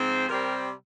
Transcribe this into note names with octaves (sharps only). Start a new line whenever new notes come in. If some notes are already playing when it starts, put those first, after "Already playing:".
Already playing: G#2 F3 C4
C3 G3 C4 A#4